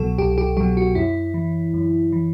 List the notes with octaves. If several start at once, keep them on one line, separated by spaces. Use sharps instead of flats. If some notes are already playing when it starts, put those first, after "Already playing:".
Already playing: C2 B2 F#3 A4
C2 G4
G4
B2 F#3 G4
F#4
F#2 E4
E3
F#2
E3